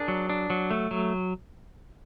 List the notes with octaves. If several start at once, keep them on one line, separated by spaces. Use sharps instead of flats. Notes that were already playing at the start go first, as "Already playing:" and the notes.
Already playing: D4 G#4 A#4
F#3
D4
F#3
A3
F#3